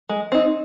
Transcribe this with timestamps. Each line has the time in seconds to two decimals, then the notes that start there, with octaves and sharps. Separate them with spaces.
0.09 G#3
0.32 C4 D#4